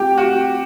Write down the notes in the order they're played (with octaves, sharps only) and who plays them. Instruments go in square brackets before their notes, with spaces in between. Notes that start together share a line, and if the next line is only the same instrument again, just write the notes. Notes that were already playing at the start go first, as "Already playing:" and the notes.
Already playing: [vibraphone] A3 C4 F4 [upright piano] G4
[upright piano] F#4